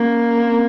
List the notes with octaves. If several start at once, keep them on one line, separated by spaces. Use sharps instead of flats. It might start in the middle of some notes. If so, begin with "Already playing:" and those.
Already playing: A#3 C#4
C4